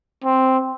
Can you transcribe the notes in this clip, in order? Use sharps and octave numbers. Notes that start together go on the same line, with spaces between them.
C4